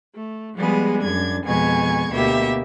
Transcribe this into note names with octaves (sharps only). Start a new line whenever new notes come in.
A3
F3 G3 G#3 B3 G#4
F#2 D4 G#6
F2 B2 G#3 G#5 C#6 G#6
D2 B2 A#3 G4 E5